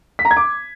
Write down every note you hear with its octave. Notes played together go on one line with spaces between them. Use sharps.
B6
A#5
G#6
D6